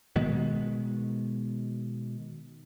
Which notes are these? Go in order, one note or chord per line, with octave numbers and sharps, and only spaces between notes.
B2 D#3 G#3 B3